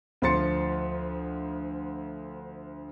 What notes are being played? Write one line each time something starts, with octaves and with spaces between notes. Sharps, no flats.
D2 F3 C6 A6 C#7